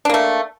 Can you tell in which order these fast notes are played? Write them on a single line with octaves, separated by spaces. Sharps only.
D4 A#3 A3